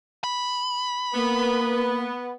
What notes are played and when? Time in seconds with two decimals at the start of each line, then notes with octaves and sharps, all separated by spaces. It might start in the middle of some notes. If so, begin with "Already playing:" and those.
0.24 B5
1.14 A#3 B3